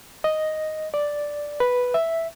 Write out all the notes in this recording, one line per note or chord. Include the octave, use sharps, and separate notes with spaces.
D#5
D5
B4
E5